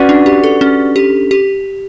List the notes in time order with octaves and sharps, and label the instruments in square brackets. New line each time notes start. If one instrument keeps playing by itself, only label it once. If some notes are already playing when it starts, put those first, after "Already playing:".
Already playing: [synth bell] C#4 [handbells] F#4 B4 D5 F#5
[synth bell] D4
G4
A4
C#4
G4
G4